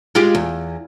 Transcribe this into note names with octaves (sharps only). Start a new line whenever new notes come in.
G#3 F4 G4
E2